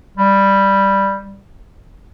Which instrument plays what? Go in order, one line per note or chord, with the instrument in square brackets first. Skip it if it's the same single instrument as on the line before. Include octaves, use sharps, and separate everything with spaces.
[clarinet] G3